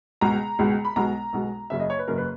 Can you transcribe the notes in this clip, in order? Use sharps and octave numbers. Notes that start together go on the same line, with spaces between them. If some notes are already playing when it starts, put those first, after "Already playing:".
C#2 B2 G#3 A#5
C#2 B2 G#3
B5
B1 B2 G#3 A#5
B1 B2 G#3
F#1 F#2 C#3 E5
D#5
C#5
B4
F#1 F#2 C#3 A#4
B4